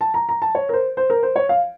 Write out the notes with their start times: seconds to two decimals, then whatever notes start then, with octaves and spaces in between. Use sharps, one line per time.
0.01 A5
0.14 A#5
0.29 A#5
0.42 A5
0.55 C#5
0.69 A#4
0.73 C5
0.97 C5
1.10 A#4
1.23 C5
1.36 C#5
1.49 F5